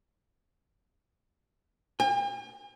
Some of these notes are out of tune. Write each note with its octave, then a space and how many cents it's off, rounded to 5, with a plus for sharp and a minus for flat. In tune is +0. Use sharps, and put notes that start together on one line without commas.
G5 +45